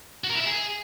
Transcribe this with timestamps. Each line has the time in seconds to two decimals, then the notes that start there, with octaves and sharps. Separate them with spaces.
0.24 F#4
0.30 A#4
0.35 E4
0.40 E5
0.46 G#4